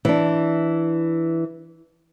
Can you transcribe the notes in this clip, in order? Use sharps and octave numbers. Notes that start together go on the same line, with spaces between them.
E3 D4